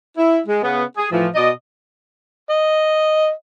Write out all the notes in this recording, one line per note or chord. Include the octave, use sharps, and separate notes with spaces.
E4
G#3
C#3 B3
G#4
A2 E3 F3
B2 D5 D#5
D#5